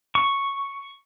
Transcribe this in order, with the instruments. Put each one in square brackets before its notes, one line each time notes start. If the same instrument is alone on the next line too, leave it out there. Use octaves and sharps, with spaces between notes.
[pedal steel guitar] C#6